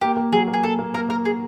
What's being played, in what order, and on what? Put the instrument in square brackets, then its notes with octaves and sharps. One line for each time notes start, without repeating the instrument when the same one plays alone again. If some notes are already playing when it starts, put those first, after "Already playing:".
[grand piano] A#3 [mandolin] G4
[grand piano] A#3
[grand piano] F#3 [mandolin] G#4
[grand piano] A#3
[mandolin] G#4
[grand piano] A#3 [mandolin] A4
[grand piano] A#3
[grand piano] A#3 [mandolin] A#4
[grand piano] A#3 [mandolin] A#4
[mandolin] G#4